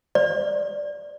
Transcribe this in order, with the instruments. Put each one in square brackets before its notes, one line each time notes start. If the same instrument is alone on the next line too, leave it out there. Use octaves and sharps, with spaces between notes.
[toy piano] D5